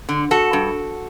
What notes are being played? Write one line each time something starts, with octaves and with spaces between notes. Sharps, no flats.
D3
F#4 A4
G2